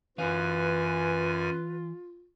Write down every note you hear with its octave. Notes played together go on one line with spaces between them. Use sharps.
F#2 E3 F4 B4 C#5 F5 G#5